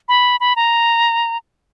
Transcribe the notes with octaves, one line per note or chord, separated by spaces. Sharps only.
B5
B5
A#5